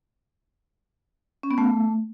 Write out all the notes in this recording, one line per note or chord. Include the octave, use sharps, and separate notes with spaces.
C#4
B3
A3